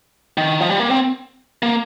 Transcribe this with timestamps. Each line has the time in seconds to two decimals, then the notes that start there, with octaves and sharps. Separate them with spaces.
0.37 D#3
0.60 F3
0.69 G3
0.80 A#3
0.91 C4
1.63 A#3